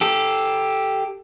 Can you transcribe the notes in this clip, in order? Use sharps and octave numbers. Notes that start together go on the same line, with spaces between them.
G4 A4